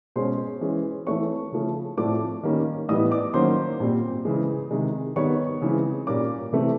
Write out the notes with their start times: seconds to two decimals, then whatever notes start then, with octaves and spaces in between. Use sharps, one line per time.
0.16 B2 G#3 C#4 C5 C6
0.61 E3 G#3 C#4
1.06 E3 A3 C4 C#5 C#6
1.52 C#3 F3 A3 C#4
1.97 A2 F3 A3 C4 D5 D6
2.43 D#3 G3 A#3 C#4
2.89 A2 E3 G3 B3 D#5 D#6
3.11 D5 D6
3.34 D#3 F#3 A#3 C#4 C5 C6
3.80 A#2 G3 C4
4.25 C#3 E3 G#3
4.71 C3 D#3 G#3
5.16 D#3 G3 B3 C#5 C#6
5.62 C#3 E3 G#3 C4
6.07 A#2 G3 A#3 C#4 D5 D6
6.53 C3 E3 A3 C4